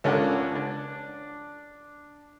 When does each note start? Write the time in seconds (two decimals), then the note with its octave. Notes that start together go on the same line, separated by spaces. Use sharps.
0.04 C#2 C#4 D4 A4 A#4 F#5
0.55 D4